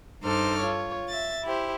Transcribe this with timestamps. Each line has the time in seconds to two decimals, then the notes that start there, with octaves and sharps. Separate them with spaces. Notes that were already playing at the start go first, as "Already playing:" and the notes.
0.22 G2 D#4 A4 C5 D6 F6
0.60 F4 C#5
1.09 E5 A6
1.43 E4 G4 C5